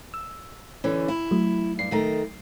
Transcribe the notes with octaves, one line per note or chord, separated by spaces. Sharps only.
E6
D3 E3 C#4
E4
F#3 A3
G2 C7
D#3 A3 A#4